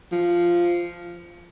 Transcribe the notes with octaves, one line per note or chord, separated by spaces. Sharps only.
F3